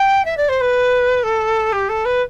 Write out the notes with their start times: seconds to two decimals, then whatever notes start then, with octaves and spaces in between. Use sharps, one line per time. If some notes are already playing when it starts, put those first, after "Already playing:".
Already playing: G5
0.24 E5
0.37 D5
0.48 C5
0.60 B4
1.23 A4
1.72 G4
1.88 A4
2.05 B4